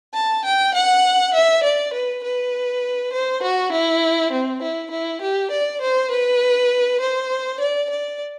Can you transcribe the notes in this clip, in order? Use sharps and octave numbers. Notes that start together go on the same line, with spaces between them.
A5
G5
F#5
E5
D5
B4
B4
C5
F#4
E4
C4
E4
E4
G4
D5
C5
B4
C5
D5
D5